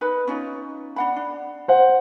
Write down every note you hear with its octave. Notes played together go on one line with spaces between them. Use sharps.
D#4 B4 B5
C#4 D#4 F4
D4 F#5 B5
D4
C5 F#5